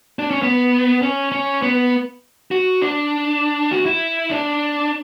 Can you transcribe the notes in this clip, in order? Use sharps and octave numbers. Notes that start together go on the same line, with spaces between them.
D4
C#4
B3
C#4
C#4
B3
F#4
D4
F#4
E4
D4